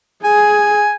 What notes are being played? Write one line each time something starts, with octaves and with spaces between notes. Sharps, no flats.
G#4 G#5